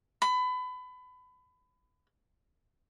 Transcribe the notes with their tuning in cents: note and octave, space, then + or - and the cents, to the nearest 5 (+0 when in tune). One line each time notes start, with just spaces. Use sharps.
B5 +30